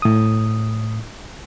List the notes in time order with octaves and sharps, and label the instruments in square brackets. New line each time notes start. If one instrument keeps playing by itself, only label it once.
[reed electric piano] A2 D#6